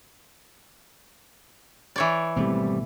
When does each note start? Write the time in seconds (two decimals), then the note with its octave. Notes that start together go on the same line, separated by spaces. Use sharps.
1.96 E3 C#5 D5
2.36 G#1 B2 G3 A3 C4